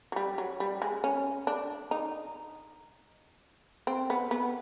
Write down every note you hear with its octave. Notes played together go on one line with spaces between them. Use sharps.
F#3
G3
F#3
G3
G#3
C#4
D4
D#4
C4
B3
B3